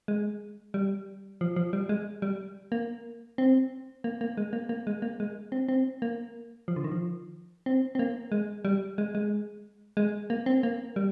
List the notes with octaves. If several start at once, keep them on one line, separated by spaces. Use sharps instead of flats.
G#3
G3
F3
F3
G3
G#3
G3
A#3
C4
A#3
A#3
G#3
A#3
A#3
G#3
A#3
G#3
C4
C4
A#3
F3
D3
D#3
F3
C4
C4
A#3
G#3
G3
G#3
G#3
G#3
A#3
C4
A#3
G3